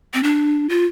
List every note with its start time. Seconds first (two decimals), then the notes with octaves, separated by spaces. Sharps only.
0.14 C4
0.23 D4
0.69 F4